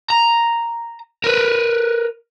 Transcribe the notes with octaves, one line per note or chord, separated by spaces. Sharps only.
A#5
A#4 B4